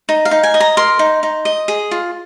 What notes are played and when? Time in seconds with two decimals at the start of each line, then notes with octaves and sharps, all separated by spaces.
0.09 D#4
0.25 F5
0.31 D#4
0.43 G#5
0.54 D#5
0.60 A#5
0.77 A#4 C6
0.99 D#4
1.23 D#4
1.45 D#5
1.68 G#4
1.91 F4